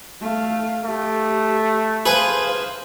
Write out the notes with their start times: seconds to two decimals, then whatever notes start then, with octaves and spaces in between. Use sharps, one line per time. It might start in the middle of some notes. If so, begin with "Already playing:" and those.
0.21 A3 F5
0.85 A3 G4
2.06 G#4 B4 C5 F5